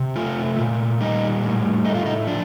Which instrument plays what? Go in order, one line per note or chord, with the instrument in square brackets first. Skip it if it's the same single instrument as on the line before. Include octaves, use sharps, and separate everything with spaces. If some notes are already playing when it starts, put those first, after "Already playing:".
Already playing: [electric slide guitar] C3
A3 F4
A#2
G3 D#4
A2
A3 D#4
F4
D#4
F3 D4